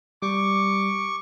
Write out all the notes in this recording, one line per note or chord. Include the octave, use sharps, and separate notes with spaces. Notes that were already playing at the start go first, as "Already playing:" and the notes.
G3 C#6 D6